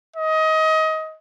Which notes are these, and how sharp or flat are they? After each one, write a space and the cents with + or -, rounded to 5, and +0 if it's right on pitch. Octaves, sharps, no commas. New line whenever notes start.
D#5 +25